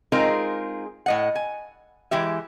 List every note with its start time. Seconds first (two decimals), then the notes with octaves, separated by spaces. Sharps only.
0.12 G#3 C4 D#4 F4 G#4 A#4
1.06 A2 D#5 F#5
1.35 G#5
2.11 E3 G#3 G4 E5